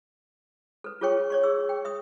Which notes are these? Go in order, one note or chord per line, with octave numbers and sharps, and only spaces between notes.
A4 B4
F4 G#4 A4 C#5 G5 C#6
C#5 D5 C#6
G#4 C#6 E6
G5
E5 D#6